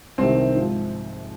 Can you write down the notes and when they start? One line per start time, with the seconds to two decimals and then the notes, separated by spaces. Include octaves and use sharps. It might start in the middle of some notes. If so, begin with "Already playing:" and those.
0.18 C2 C3 D#3 C4
0.54 G#2 F3